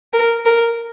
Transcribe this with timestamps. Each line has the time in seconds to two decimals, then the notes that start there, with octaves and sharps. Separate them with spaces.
0.13 A#4
0.46 A#4